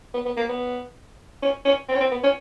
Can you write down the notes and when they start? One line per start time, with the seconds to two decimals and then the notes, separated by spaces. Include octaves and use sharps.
0.14 B3
0.25 B3
0.37 A#3
0.49 B3
1.42 C#4
1.65 C#4
1.88 C4
1.95 C#4
2.00 C4
2.11 B3
2.23 C#4